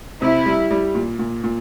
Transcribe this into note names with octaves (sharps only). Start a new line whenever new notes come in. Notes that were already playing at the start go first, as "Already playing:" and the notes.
C3 E4
G3
G3
A#2
A#2
A#2